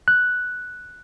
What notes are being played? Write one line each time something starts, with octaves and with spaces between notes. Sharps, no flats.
F#6